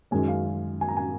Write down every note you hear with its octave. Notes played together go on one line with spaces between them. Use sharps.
F#2 D#3 G#3 C#4 G#5
F5
G#5
A#5
G#5